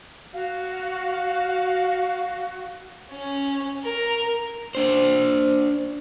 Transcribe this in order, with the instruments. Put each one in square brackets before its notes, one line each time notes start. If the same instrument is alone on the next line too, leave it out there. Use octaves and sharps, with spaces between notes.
[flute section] F#4 [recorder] F5
[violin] C#4
A#4
[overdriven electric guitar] D4 C5